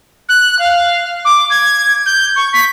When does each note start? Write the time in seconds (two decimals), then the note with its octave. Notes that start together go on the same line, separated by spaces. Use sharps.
0.29 F#6
0.59 F5
1.25 D6
1.50 G#6
2.06 G6
2.36 C#6
2.53 B6